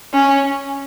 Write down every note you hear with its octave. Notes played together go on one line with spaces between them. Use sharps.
C#4